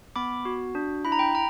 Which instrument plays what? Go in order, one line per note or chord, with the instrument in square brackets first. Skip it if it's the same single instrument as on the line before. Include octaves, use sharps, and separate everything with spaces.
[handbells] B3 B5 D6
F#4
D4
E4 B5
A#5
G5 B5
A#5